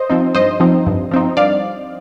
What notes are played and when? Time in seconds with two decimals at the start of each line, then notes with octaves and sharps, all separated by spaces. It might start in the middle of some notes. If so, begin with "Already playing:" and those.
Already playing: C5 D#5
0.10 F3 C4 D#4
0.35 G2 C5 D#5
0.60 F3 C4 D#4
0.87 G2
1.11 F3 C4 D#4
1.37 G2 D5 F5